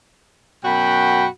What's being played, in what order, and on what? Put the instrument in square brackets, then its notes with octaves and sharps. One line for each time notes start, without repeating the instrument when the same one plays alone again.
[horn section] F#2 B2 F#4 G5 B5